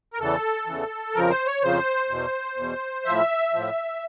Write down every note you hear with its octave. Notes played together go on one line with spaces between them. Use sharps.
A#4
E2 C#3 E3 A4
E2 C#3 E3
F2 C#3 F3 A#4
C5
C#5
F2 C#3 F3 C5
E2 B2
E2 B2
A2 F3 E5
A2 F3